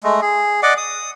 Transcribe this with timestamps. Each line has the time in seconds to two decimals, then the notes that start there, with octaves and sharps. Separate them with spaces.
0.03 G#3 A3
0.22 G#4
0.63 D5 D#5 F#5 D6
0.77 D#6